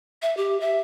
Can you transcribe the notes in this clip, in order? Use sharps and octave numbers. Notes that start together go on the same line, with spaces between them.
E5
G4
E5